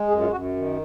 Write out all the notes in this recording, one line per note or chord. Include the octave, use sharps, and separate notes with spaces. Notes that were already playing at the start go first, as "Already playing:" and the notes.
Already playing: G#3
F#2 G#4
F4
F#2 F#4
D#3